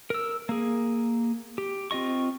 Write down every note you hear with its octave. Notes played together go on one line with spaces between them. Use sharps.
A#4 E6
A#3 G#4
G4
C4 F4 D#5 C#6